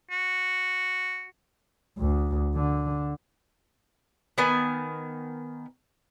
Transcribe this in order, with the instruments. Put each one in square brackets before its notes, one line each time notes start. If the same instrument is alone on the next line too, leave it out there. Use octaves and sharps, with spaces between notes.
[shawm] F#4
[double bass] D2
D3
[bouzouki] D#3 B3 G#5